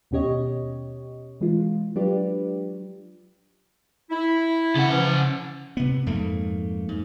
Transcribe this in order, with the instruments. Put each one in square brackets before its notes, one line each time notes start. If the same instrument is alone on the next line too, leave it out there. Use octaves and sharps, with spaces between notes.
[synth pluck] D#2 B2 C#4 G4 C#5 D#5
E3 G#3 F4
F#3 D4 F4 G4 B4 D5
[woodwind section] E4
[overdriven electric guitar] C#3 F#5
[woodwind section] E3 F3 C#4
[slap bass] C3 B3
F2 G#2 A3 A#3
G#2